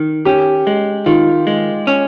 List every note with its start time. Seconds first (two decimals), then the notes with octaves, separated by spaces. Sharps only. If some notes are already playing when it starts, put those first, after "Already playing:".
Already playing: D#3
0.25 C#4 G4
0.67 G#3
1.06 D#3 F4
1.47 G#3
1.87 C#4